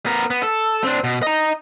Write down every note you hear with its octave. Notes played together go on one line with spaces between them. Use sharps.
B3 A#4
B3
A4
C4 D4
B2
D#5 A#5